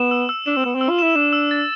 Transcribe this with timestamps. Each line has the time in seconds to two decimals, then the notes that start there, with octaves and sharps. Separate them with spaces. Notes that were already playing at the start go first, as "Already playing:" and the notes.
Already playing: B3 E7
0.11 E6
0.29 E6
0.46 D4 E7
0.56 C4
0.64 B3 E6
0.75 C4
0.81 E6
0.89 F4
0.99 E4 E7
1.15 D4 E7
1.33 E6
1.51 A6